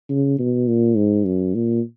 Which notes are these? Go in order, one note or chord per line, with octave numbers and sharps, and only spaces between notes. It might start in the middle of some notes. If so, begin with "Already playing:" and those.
C#3
B2
A#2
G#2
F#2
A#2